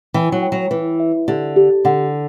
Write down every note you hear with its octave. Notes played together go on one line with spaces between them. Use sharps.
E3 G5
F#3
G5
F#3
E3 B4
E5
D3 G4
G4
D3 F#5